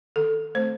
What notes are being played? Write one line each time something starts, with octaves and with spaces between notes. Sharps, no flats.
D#3 A4
A3 C4 C5